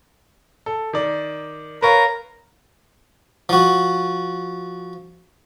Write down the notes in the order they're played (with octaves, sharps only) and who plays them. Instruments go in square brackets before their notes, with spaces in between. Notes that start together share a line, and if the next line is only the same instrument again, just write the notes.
[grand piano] A4
D#3 D5
[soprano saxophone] A#4 [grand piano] B4 C#5 F5
[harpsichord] F3 F#4